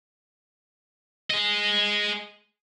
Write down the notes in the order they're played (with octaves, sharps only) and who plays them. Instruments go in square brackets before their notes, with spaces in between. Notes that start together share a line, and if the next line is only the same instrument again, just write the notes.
[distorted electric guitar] G#4 D#5